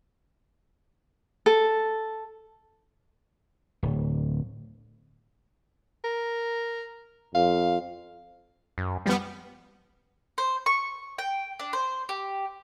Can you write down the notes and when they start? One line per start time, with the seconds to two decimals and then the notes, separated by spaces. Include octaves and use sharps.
1.46 A4
3.83 D1
6.04 A#4
7.35 F2 F5
8.78 F#2
9.06 F3 G3 B3
10.38 C5
10.66 C#6
11.18 G5
11.60 D4
11.73 C5
12.09 G4